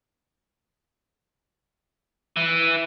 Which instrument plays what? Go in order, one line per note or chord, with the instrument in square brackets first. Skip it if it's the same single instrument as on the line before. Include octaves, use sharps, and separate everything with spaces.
[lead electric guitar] E3